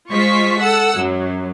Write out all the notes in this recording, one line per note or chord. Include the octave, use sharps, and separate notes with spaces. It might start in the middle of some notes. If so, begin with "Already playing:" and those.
G#3 F4 C5 C#6 B6
A4 F#5 E6
F#2 F#3